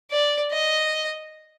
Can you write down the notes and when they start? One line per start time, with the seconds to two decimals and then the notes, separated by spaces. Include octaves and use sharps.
0.11 D5
0.51 D#5